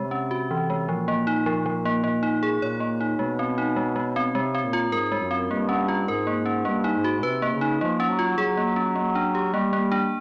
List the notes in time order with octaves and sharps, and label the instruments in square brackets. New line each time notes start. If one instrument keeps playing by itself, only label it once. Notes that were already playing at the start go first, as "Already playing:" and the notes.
Already playing: [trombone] C3 [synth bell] G#3
[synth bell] C#4
F#4
E3
G#3
[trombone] A#2 [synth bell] F3
[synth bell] A#3
D#4
F3
F3
A#3
[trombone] A#2 [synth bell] A#3
[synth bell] D#4
G#4
[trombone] A#2 [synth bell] C#5
[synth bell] A#3
D#4
[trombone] B2 [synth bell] G#3
[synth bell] C4
D#4
G#3
G#3
C4
[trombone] C3 [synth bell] G#3
[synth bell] C4
[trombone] A#2
[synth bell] F4
[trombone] G#2 [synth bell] A#4
[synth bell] G#3
[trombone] F#2
[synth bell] C4
[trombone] G2 [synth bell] A#3
[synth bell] C#4
F4
[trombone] G#2 [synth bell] A#4
[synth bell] A#3
C#4
[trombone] G2 [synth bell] A#3
[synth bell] D#4
[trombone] G#2
[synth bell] F#4
[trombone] C3 [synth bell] B4
[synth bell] A#3
[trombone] C#3
[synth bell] D#4
[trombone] F3 [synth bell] A#3
[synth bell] C#4
[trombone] F#3
[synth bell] F4
[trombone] F#3 [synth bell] G#4
[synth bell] A#3
C#4
A#3
D4
G4
[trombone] G3 [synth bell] A#3
[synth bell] A#3
D4